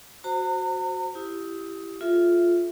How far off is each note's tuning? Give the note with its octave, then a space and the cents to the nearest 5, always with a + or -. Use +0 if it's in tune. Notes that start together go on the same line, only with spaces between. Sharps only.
F#4 +0 C5 +0 A#5 -40
E4 +20 G4 +0 D#6 +20
F4 +0 A4 -45 E5 +10